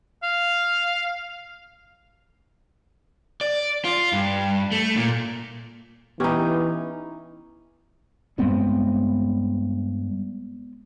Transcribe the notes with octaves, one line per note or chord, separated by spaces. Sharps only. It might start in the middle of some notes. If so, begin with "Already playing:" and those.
F5
D5
F4
G2
A3
A#2
E3 B3 C#4 D#4 E4 G4
G2 G3 G#3 B3 C4